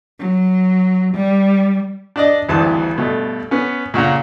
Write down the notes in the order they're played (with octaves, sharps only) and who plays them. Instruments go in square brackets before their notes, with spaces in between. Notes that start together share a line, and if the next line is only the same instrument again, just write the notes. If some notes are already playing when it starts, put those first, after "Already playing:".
[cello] F#3
G3
[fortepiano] D4 D5 D#5
G#1 D2 G2 E3 A5
G2 B2 A3
B3 C#4
A#2 C#3 F#5 A#5